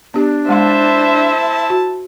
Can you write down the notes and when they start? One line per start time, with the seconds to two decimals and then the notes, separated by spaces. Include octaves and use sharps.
0.14 B3 D4 G4
0.49 G#3 E4 C5 E5 F5 A5 C6
1.70 F#4